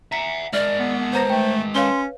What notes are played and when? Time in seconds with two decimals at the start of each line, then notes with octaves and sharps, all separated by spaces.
0.12 E5 F#5 A#5 B6
0.53 G#3 A#4 D5 E5 F6
0.79 B3
1.13 B4 C5 A#5 A#6
1.30 A3 G5
1.75 C#4 B4 C#5 F5 C6